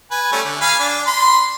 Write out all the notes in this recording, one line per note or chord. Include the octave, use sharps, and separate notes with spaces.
B4 G#5
G3 A3 C#4
D3
F5 G#5 B5
D4
B5 C6